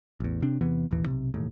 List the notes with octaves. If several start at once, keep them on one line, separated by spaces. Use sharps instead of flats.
A1 E2
C3 C4 D4
E2 C3 E3 B3
E1 A1 D#2 E3
B1 F2 C3
E1 D#2 A2